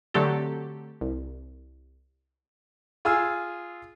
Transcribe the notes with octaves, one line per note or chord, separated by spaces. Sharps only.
D3 F#3 A3 C4 G4 A4
C2
F4 G#4 G#5 E6 F6